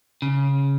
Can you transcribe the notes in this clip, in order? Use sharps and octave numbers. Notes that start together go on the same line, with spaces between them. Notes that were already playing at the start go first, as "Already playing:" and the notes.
C#3